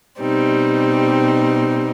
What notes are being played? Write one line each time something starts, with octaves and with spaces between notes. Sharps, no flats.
B2 G3 C4 D#4